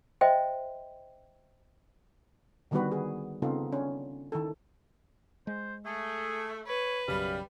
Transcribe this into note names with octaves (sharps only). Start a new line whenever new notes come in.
C5 D#5 E5 G5 C6
D3 D#3 G3 B3 F#4 B4
G#4
C#3 B3 C4 D#4 F4 A4
C#4 D4
D#3 E4 A4
G#3 C5
A3 G#4
B4 C#5
B1 F#2 C#3 G3 F5